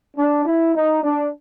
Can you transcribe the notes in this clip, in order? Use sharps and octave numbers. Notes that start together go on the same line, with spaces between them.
D4
E4
D#4
D4